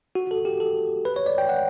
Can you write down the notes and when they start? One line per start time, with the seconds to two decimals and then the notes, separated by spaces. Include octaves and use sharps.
0.15 F#4
0.31 A4
0.45 G4
0.60 A4
1.05 B4
1.16 C#5
1.26 D5
1.38 G5
1.49 F#5